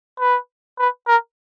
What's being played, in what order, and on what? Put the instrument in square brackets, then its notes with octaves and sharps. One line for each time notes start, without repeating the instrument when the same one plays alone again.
[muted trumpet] B4
B4
A#4